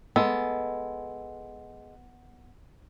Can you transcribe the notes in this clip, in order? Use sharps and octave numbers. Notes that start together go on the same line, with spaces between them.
G#3 B3 A4